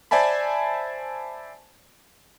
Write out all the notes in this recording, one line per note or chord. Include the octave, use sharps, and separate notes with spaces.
C5 D5 E5 G#5 A5 B5